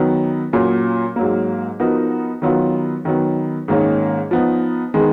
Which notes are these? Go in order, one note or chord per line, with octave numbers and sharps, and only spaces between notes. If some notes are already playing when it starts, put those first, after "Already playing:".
Already playing: D#3 F#3 B3
A#2 F#3 A#3 C#4
G#2 F#3 A#3
F3 B3 D#4 F#4 A#4
D#3 F#3 B3 F4
D#3 F#3 B3
G#2 D#3 A#3 C#4
F3 B3 D#4
D#3 G#3 B3